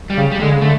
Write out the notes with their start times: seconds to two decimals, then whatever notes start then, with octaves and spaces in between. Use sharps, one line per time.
0.10 G3
0.17 C#3
0.31 G3
0.40 D3 G#3
0.51 C#3
0.61 D3 A3